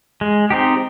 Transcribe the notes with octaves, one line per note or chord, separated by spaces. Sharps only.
G#3
C4 D#4 G4